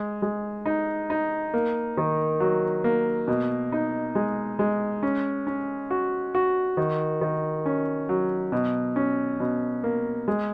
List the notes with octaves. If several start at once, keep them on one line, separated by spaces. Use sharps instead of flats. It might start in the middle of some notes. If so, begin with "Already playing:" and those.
Already playing: G#3
G#3
D#4
D#4
A#3
D#3
F#3
A#3
B2
D#4
G#3
G#3
C#4
C#4
F#4
F#4
D#3
D#3
C#4
F#3
B2
C#4
B2
A#3
G#3